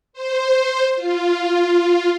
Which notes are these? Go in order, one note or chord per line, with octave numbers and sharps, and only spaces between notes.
C5
F4